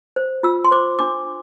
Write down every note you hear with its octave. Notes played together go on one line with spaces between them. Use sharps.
C5
F4 E6
C6
C5 D6
D4 D6